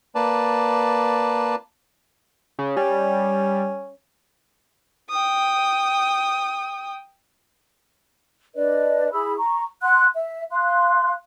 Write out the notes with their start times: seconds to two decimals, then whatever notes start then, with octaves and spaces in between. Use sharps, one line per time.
0.15 A#3 B4 D5 A5
2.59 C#3
2.77 G3 C#4
5.10 G5 D#6
8.56 D4 B4 D5 D#5
9.11 E4 G#4 B5 E6
9.38 A#5 C#6
9.82 F#5 C6 F#6
10.15 E5
10.52 F5 C6 F#6